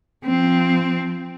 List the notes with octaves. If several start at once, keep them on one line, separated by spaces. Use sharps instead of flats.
F3 C4